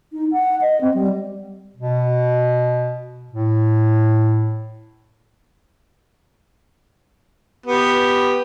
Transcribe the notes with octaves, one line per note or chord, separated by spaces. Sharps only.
D#4
F#5
D#5
C4
G3
B2
A2
B3 G4